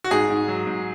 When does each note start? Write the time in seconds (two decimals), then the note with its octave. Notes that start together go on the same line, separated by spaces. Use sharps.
0.04 F#4
0.11 G#2 G#4
0.30 G#2
0.48 F#3
0.67 G#2